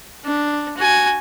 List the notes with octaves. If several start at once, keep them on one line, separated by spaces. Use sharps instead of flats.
D4
F#4 G#5